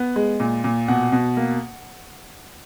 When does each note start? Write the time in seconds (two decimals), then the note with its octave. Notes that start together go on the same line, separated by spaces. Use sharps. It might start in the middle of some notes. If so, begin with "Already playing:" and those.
Already playing: B3
0.16 G#3
0.40 A#2
0.64 A#2
0.88 B2 F#5
1.12 B2
1.37 A#3